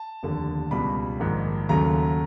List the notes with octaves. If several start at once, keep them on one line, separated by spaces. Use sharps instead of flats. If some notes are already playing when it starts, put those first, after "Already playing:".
Already playing: A5
F1 D#2 D3
C#2 B2 G3 B5
A#1 G#2 D#3
D#2 C#3 F#3 A3 A#5